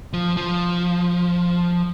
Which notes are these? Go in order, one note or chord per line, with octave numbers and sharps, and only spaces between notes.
F3
F3